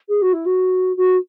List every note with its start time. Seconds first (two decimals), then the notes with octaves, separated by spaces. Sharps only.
0.09 G#4
0.22 F#4
0.33 E4
0.46 F#4
0.97 F#4